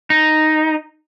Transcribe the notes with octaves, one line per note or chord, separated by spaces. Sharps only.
D#4